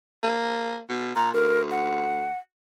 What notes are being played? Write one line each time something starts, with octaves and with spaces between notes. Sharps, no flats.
A#3
B2
A#2 A#5
D2 A#4
F#5